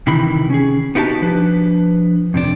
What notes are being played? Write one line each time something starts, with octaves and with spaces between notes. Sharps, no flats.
C3 D#3 E3 B5
C#4 G#4
B3 D#4 E4 F#4 G4 A5
F3 D4 B4
F2 C3 D4